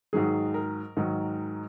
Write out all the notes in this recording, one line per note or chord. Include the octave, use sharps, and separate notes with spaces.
G#2 D#3 F#3 G#4
A#4
G#2 D#3 F#3